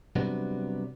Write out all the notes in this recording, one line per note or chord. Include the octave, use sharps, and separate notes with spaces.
C3 F#3 G3 B3 D4